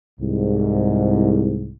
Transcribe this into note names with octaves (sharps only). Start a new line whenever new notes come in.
C2 G#2